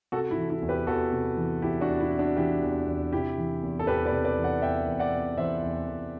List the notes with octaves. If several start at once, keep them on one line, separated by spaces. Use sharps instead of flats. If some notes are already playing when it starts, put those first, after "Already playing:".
C3 F#4 A4
E4
E3
E4
E2
G4 B4
E2 F#4 A4
C3
E3
E2 E4 G4
D4 F#4
E2
E4
C3
D4 F#4
E3 E4 G4
E2
E2
C3 E4 G4
E3
E2
A4
E2 G4 B4
B4 D5
C3
B4 D5
E3
D5 F#5
E2 E5 G5
E2
D5 F#5
C3
E3 C5 E5
E2
E2